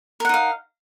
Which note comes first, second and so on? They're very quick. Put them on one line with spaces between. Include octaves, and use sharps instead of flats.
A#4 F#5 D#4 F5